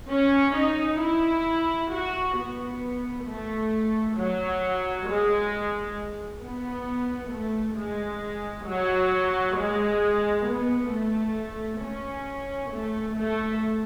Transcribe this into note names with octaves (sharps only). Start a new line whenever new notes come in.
C#4
D#4
E4
F#4
B3
A3
F#3
G#3
B3
A3
G#3
F#3
G#3
B3
A3
C#4
A3
A3